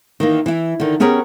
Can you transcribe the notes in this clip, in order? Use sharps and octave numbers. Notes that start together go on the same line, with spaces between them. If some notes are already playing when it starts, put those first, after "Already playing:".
D#3 E3 A#3
E3 E4
D3 D#3
B3 C#4 G4 G#4 A#4 C#5